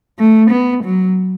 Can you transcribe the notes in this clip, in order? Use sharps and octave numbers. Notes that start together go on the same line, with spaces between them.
A3
B3
F#3